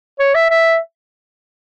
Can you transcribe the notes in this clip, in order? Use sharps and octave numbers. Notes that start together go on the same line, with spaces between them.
C#5
E5
E5